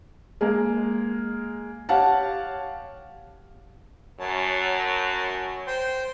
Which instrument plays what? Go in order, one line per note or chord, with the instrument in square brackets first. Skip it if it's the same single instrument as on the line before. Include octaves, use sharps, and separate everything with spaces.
[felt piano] G#3 A#3
G4 C#5 F5 F#5 A5
[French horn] F#2 [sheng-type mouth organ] A#4 C#5 A5
[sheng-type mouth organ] C5 G5 C6